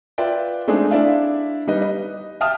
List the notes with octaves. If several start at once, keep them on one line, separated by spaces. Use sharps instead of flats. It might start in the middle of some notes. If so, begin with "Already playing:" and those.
F4 B4 D5 E5 G5
G#3 A3 C4 D4 D#4 G#4
D4 E4 D5 E5 F5
G3 D#4 B4 D#5
D#5
E5 F5 G5 A5 D#6 F6